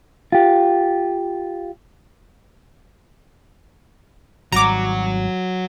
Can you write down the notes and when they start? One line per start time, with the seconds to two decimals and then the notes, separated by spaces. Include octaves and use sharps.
0.32 F4 G4
4.52 G#1 F#3 G3 F#4 A#5 D6